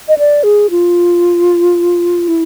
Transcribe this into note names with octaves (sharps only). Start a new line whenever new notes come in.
D#5
D5
G#4
F4
E4